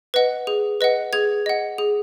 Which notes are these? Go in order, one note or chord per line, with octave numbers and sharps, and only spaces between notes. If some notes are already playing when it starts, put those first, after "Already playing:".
B4 D#5 F#5
G#4
B4 D#5 F#5
G#4 G#6
D#5 F#5
G#4